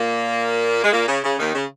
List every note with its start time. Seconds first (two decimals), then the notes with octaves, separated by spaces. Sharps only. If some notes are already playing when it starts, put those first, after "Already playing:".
Already playing: A#2 A#3
0.84 G#3
0.92 A#2 A#3
1.08 C#3
1.24 C#3
1.39 D#2 D#3
1.55 C#3